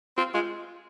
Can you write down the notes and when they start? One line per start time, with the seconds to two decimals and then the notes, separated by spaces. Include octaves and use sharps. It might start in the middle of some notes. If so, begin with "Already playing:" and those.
0.17 C4 F4
0.34 G#3 F4